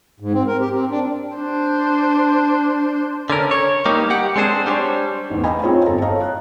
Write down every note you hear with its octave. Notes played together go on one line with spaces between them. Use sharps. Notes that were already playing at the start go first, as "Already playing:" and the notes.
G#2
C4
A#4
G4
C4
D4
D4 C5
D3 C#4 A#4
C#5
G3 A#3 D#4 G4
G4 F#5
G#3 C4 D4 G#4 C5
G3 D4 A4 C5 C#5
A1 E2
D#5 F5 G5 G#5 A#5 B5
C4 F4 G#4 C5 C#5
G1 A4 A#5
C#5 D#5 F5 A5 A#5
F#6